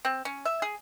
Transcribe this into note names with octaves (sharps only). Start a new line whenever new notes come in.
C4
C#4
E5
G#4